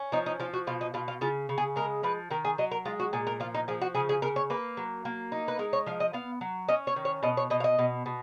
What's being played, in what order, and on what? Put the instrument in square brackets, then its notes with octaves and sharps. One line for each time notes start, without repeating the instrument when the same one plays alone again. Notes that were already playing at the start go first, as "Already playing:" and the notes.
Already playing: [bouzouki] C#4
F3 D#4
D#4
F3 F4
F#4
B2 F4
D#4
B2 F4
F4
C#3 F4
C#3
G#4
G#3 A#4
F3 B4
D#3 A#4
G#4
F#3 D#5
A#4
G#3 F4
F#4
A#2 G#4
A#4
F3 F4
D#4
F3 G#4
F#4
C#3 G#4
G#4
C#3 A#4
C#5
A#3 B4
F#3
A#3
D#4
B4
G#3 A#4
C#5
F3 F5
D#5
B3 F5
F#3
C#4 D#5
C#5
D#3
C#5
B2 D#5
C#5
B2 D#5
F5
D#5
B2
B2